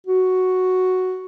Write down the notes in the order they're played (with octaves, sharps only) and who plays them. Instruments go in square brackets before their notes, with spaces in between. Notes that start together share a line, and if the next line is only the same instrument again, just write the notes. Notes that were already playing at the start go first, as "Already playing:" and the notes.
[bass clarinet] F#4